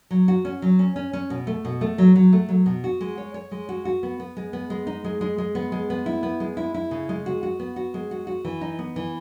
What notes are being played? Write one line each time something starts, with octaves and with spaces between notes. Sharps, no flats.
F#3
F#4
C#4
F#3
C#4
C#4
C#4
B2
A3
B2
A3
F#3
F#3
A3
F#3
B2
F#4
G#3
C#5
C#5
G#3
F#4
F#4
B3
B3
G#3
B3
G#3
D#4
G#3
G#3
G#3
B3
G#3
B3
E4
B3
G#3
E4
E4
C#3
G#3
F#4
F#4
B3
F#4
G#3
F#4
F#4
E3
D#4
B3
E3